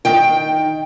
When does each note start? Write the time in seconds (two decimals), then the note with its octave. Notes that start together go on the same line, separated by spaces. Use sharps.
0.05 D#3 G5